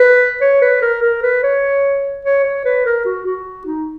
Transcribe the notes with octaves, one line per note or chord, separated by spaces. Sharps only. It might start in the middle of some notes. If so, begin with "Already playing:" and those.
Already playing: B4
C#5
B4
A#4
A#4
B4
C#5
C#5
C#5
B4
A#4
F#4
F#4
D#4